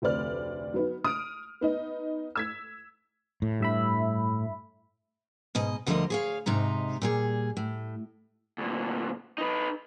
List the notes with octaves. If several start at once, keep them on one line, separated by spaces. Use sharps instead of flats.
F1 D2 C4 B4 D5 F6
F#3 B3 D#4
D#6 F6 D7
B3 D#4 D#5
E6 G#6 B6
A2
G2 E5 B5
G#2 B2 D#5
D2 D3 F3 G3 A#4 D#5
G#4 C#5 F5
G#2 C3 D#4 A#5
A#2 G3 G#4
A2
D2 A#2
D#4 B4